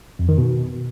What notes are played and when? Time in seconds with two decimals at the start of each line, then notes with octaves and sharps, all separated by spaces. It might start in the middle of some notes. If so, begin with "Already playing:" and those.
0.19 F2
0.29 D#3
0.38 B2